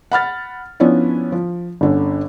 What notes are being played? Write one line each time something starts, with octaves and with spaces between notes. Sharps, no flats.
F#5 B5 F6 A6
F3 B3 C#4 D4 E4
F3
G1 D3 C#4